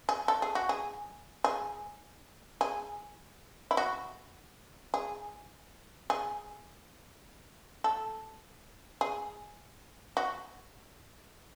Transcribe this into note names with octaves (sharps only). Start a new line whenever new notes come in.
G#4
A4
G#4
F#4
G#4
G#4
G#4
E4
F#4
G#4
G#4
A4
G#4
F#4